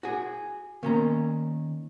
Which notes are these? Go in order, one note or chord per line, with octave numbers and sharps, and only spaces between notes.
F#4 G#4
D#3 A#3 B3 C#4 A#4 A#5